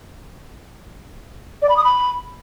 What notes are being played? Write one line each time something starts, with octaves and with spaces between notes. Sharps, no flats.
D5
B5
D#6
B5